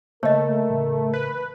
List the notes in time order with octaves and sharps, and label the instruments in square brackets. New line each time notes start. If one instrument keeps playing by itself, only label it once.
[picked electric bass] C#3 A#3 [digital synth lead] A3 [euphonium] A#4 [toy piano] C#5 D#5
[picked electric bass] A1 C#3
[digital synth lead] B4